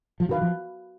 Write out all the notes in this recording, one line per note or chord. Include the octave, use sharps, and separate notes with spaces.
F3
D#3 F#4 B4 F5
F3